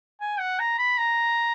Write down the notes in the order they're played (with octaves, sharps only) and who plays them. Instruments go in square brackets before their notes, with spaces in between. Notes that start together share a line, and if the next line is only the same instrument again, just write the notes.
[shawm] G#5
F#5
A#5
B5
A#5